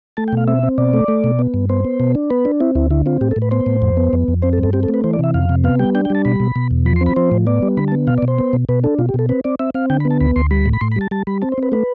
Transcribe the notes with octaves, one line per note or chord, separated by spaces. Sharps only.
A3 A5
G5
B2 F5
C4 E5
C4
B2 D5
A3
A3
B2
B3
G2
B3 C5
B3
B2
D4
B3 B4
D4
C4 E4
D2 E4
D3 E4
C4 F4
A2 G4
A4
A2
B4
B3 C5
A2
F2
B3
F2
F2
C4 C5
A4
G2
A4
C4 G4
A4
A3
B4
E3 C5
D5
C3 E5
F2 F5
C3
B3 F5
G3 G5
D4 G5
G5
G3 A5
B2 B5
B2
B2
E2
F3 B5
C6
C4
B5
F3 C5
A2
B3 D5
G3
D3 B5
A5
B3
B2 F5
D5
B2
C5
B3
B2
B2 B4
D4 A4
B2 F4
G4
B2 A4
C4 B4
C4 D5
C4 E5
C4 F5
D3 G5
B5
B3
A5
D2 B5
D2 C6
G3 B5
A2
B5
A2 C6
B5
G3 A5
G3 A5
G3 B5
C4 A5
C5
C4 B4
A3 B4